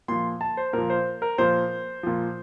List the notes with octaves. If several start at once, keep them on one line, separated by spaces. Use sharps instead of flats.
A#2 F3 C6
A5
C5
A#2 F3 A#4
C5
A#4
A#2 F3 C5
A#2 F3